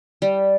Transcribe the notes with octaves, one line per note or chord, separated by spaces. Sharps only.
G3